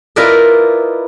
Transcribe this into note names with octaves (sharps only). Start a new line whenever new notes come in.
E4 F4 A#4 B4 D5 D#5